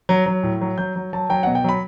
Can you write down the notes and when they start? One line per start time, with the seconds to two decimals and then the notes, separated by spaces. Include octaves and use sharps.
0.09 F#3
0.26 F#3
0.43 A2
0.61 F#3
0.78 F#3 G6
0.96 F#3
1.13 F#3 A5
1.30 F#3 G5
1.43 B2 F#5
1.55 G5
1.64 F#3 B5